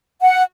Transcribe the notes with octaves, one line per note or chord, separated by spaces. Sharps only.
F#5